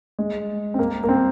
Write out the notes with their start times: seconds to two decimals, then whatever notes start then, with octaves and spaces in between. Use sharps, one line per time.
0.19 G#3
0.74 C4
0.79 A#3
1.04 A#3
1.09 C4